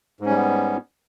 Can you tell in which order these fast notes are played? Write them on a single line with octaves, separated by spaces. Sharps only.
G#2 C#4 G3 B3